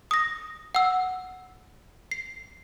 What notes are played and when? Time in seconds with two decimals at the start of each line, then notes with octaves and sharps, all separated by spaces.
0.11 D#6 A#6
0.75 F#5 E6
2.11 C7